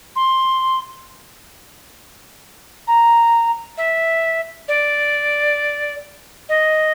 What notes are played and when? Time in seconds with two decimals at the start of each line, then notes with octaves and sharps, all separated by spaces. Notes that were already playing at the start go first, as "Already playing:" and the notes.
0.15 C6
2.87 A#5
3.77 E5
4.68 D5
6.48 D#5